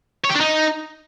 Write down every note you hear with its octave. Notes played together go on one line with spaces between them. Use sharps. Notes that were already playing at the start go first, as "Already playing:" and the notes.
C#5
G4
D4
D#4